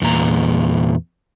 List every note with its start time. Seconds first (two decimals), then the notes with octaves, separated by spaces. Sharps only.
0.02 E2 A#2 A#5